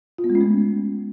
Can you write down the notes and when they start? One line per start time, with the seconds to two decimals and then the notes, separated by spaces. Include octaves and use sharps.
0.18 F4
0.24 B3
0.30 G#3
0.35 C#4
0.41 A3